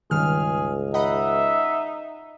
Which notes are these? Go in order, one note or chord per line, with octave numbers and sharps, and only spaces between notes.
C#2 G2 D#3 G#4 F6
D#4 D#5 E5 F#5 B5